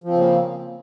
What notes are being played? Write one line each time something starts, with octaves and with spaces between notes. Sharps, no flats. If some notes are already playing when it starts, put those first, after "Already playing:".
C#3 F3 A#3 C4